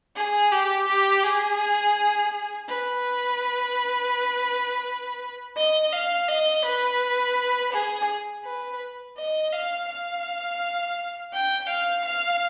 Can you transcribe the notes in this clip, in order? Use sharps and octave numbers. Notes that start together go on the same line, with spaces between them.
G#4
G4
G4
G#4
B4
D#5
F5
D#5
B4
G#4
B4
D#5
F5
F5
G5
F5
F5